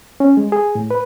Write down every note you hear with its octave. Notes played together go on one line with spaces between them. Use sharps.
C#4
G#3
G#4
A2
B4